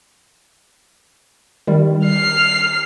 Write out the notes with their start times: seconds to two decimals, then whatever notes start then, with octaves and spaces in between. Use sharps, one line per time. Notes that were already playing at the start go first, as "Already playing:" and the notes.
1.67 D#3 G3
2.06 F6 C7